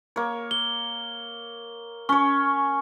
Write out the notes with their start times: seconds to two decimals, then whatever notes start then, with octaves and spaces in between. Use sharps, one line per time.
0.16 A#3 C#5
0.51 G7
2.09 C#4 C#5 C#6